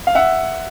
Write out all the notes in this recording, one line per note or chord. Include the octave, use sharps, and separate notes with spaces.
F5
E5 F#5